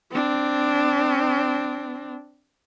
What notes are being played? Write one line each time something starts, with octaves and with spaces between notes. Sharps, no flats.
C4 D4